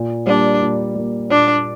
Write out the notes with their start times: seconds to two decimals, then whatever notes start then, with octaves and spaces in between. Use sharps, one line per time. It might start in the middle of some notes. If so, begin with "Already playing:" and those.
Already playing: A#2
0.27 G3 A#3 D4
0.62 A#2
0.95 G3 A#3
1.30 A#2 D4